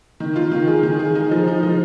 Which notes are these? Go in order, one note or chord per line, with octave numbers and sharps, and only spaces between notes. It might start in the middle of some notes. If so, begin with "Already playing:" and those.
D#3
F4
D#3
G#4
D#3
G#4
D#4
F3
D#4
F3